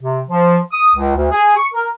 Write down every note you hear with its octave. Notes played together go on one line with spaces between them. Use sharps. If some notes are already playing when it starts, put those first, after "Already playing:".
C3
F3
D#6
C#2
D2
G#4
C#6
A#4